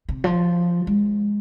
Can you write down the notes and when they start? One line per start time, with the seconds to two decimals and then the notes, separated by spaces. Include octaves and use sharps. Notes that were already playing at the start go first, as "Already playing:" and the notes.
0.09 C3
0.24 F3
0.87 G#3